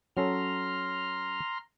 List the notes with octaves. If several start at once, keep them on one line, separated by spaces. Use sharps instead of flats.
F#3 C#4 A4 A#5 C6 F6